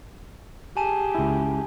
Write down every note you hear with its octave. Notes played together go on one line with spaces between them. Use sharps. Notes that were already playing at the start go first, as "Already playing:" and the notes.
G4 G#4 G#5 A5 D#7
C#2 E4